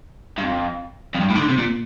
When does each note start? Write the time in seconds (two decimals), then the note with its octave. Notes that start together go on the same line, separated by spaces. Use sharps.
0.38 G2
0.43 F2
1.15 F2
1.21 G2
1.30 A2
1.35 D#3
1.39 D3
1.49 C3
1.58 A#2